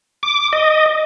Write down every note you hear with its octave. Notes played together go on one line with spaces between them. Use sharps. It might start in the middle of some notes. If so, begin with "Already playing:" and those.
D6
D#5